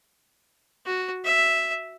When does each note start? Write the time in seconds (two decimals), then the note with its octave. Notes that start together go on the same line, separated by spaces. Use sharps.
0.86 F#4
1.24 E5